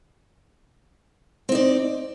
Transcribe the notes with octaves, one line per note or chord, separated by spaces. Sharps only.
C4 D#4 D5